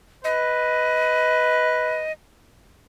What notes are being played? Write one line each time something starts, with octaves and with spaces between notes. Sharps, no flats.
B4 D#5